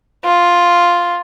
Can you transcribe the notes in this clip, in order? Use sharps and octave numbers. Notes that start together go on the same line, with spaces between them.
F4